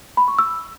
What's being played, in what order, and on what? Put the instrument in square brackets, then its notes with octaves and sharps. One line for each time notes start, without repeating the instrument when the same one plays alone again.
[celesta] B5
C#6
E6